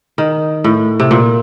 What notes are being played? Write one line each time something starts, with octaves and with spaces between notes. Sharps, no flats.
D#3
A2
C3
A#2